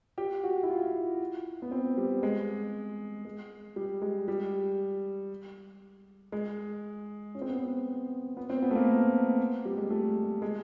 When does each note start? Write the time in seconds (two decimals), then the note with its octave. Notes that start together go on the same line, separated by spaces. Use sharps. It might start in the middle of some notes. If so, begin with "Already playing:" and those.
0.18 G4
0.44 F#4
0.63 E4
0.70 F4
1.62 B3
1.71 C4
1.98 G3
2.23 G#3
3.25 G#3
3.76 G3
4.02 G#3
4.28 G3
6.32 G#3
7.35 C#4
7.42 C4
7.50 B3
7.57 C4
8.37 B3
8.50 C4
8.62 B3
8.71 A3
8.75 A#3
9.65 G3
9.77 G#3
9.90 A3
10.42 G#3